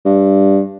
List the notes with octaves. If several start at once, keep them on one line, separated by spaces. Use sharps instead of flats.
G2